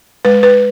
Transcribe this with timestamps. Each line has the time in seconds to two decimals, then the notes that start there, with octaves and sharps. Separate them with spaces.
0.25 G#3 B4
0.43 B4